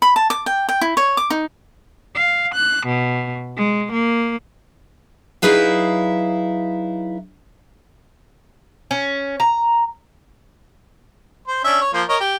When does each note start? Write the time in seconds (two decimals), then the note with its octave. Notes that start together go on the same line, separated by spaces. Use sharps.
0.02 B5
0.16 A5
0.30 D6
0.46 G5
0.69 G5
0.81 E4
0.97 C#5
1.17 D6
1.30 D#4
2.14 F5
2.54 F#6
2.87 B2
3.58 G#3
3.91 A#3
5.42 F#3 D#4 E4 G#4 B4 F5
8.91 C#4
9.40 A#5
11.48 C5
11.64 C#4 D4 E5
11.81 C#5
11.93 F3 A#3 C5
12.09 A#4 C#5 D#5
12.20 G4